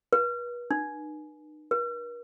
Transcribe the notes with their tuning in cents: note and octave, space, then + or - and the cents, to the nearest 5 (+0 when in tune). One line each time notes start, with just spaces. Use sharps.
B4 -40
D#4 -45
A#4 +45